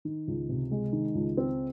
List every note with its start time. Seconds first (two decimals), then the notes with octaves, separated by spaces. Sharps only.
0.05 D#3
0.28 C#2
0.49 C3
0.71 G#3
0.93 D#3
1.15 C#2
1.37 C4